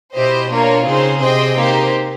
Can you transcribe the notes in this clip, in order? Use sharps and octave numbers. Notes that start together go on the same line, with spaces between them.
B2 E4 G4 C5 D#5
A#3 D4 F4 A#4 C#5
C#3 C4 D#4 G#4 C5
C3 G#4 C5 D#5 G5
A#3 D#4 G4 C5